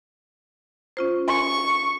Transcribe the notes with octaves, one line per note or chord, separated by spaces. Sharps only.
C#4 F4 C5
G#5 C#6